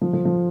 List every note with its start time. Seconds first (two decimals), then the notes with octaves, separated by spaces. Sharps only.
0.01 F3
0.13 F3
0.25 F3